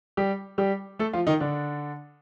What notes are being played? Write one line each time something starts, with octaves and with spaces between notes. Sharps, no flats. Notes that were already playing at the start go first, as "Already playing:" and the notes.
G3 G4
G3 G4
A3 A4
F3 F4
D#3 D#4
D3 D4